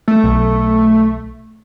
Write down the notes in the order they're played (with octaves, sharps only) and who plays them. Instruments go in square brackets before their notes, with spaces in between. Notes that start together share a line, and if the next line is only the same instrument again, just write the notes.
[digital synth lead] A3
[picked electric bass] B1